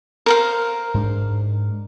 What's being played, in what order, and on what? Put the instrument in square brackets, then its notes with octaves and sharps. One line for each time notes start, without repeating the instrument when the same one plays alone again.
[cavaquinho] A#4 C5 F5
[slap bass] G#2 G#3 D4